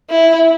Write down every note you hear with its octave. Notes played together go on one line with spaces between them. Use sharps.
E4